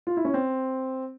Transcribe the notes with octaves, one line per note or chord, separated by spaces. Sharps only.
F4
E4
C#4
C4